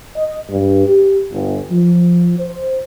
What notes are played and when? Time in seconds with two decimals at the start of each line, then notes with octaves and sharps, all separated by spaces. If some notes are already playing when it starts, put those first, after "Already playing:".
0.17 D#5
0.50 G2
0.88 G4
1.31 G1
1.70 F3
2.40 C5